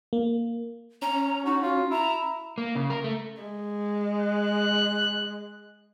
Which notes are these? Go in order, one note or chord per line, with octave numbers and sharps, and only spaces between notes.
A#3
C#4 A#5
D#4 F#4
F4 F#4
E4 A#5
A#3
C#3
A#4
A3
G#3
F#6